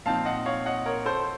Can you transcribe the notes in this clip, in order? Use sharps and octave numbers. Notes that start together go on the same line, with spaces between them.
A#2 F3 C4 D#4 F5 A5
D#5 F#5
C#5 F5
D#5 F#5
A#4 C#5
A4 C5